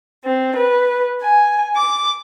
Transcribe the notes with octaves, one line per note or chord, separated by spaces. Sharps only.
C4
B4
G#5
D6